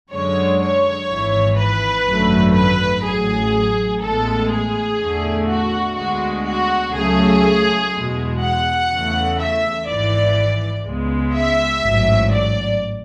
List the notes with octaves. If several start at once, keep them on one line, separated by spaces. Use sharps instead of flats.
F#2 D3 G#3 C#5
C#5
G#1 G#2 E3
B4
G#1 F#2 D3 A3
B4
A1 A2 F#3 G#4
A1 A2 G#3 B3 A4
G#4
E2 D3 A3
F#4
D2 D3 G#3 B3 F#4
F#4
C#2 C#3 F#3 A3 G#4
E2 B2 G#3
F#5
E2 C#3 E3 A3
E5
G#1 G#2 E3 D5
C#2 C#3 G#3 B3
E5
A1 G#2 F#3
D5